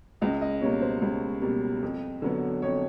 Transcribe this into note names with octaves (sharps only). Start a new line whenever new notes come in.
C#2 D#5
D#5
B2 G3 A#3 C#5
C5
C#2
B2 G3 A#3
F2
D3 F#3 B3
F2 C#5